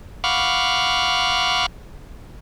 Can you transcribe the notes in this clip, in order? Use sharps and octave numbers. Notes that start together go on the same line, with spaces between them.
F5 F#5 B5 C#6 D6 F6